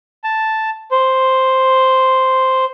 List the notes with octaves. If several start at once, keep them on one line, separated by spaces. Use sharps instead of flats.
A5
C5